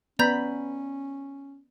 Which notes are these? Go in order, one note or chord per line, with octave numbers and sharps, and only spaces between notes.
B3 C#4 D5 A#5 B5 G6